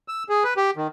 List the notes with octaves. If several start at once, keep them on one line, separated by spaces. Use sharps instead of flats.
E6
G#4
B4
G4
D#3